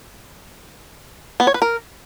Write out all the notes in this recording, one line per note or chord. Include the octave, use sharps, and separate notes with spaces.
B3
C#5
B4
A#4